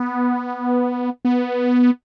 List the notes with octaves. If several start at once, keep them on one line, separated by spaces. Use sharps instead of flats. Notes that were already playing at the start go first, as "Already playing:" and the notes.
Already playing: B3
B3